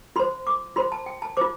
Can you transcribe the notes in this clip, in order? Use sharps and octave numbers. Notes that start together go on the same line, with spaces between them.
F4 C5 C6
D6
F4 C5 C6
A5
G5
A5
F4 C5 D6